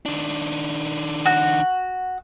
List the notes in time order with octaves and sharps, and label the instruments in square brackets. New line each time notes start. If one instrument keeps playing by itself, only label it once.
[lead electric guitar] D#3 D4
[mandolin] F#4